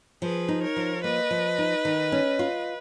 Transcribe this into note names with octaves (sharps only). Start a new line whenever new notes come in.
F3 G#4 B4
D#4
A#4 C#5
F3
A#3 B4 D#5
F3
D#4
D#3
C#4
F4